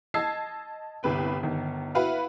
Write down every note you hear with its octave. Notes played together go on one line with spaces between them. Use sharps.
D#5 A5 E6 G#6 C7
G1 C2 B4 G5
G1 D#3
E4 F#4 B4 F5